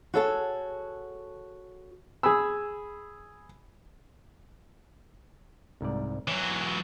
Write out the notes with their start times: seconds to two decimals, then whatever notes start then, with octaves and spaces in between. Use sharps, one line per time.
0.14 F#4 G#4 A4 C#5 F#5 A5
2.23 G#4 G#5 B5 E6
5.81 C2 G#2 D5
6.28 E3 F#3 C#5